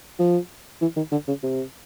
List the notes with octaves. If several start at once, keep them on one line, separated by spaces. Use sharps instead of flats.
F3
E3
D#3
D3
C#3
C3